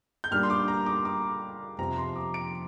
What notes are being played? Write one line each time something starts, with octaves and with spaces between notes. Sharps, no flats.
G6
A#2 G3 A#3 D4 F6
C6
D6
A#5
D6
D6
F2 C3 F3 C4 A#5
C6
D6
D7